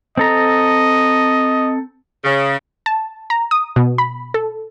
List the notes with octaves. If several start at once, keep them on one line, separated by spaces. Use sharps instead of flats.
C4 A4 D#5 A#5
C#3
A5
A#5
D#6
B2
B5
A4